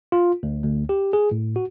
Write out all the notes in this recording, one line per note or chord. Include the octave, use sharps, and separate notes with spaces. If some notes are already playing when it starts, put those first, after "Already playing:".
F4
D2
D2
G4
G#4
A2
F#4